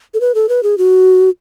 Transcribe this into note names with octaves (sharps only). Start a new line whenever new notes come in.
A4
B4
A4
B4
G#4
F#4